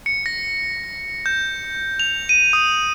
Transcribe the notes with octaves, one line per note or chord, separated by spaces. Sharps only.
C#7
A#6
G6
F7
D#7
D#6